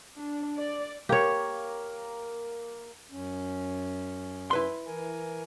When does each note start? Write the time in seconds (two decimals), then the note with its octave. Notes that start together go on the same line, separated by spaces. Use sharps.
0.17 D4
0.57 D5
1.09 A#3 G4 A#4 C#5
3.11 F#2 C#4
4.51 E4 B4 C6
4.87 E3 A#4 G#5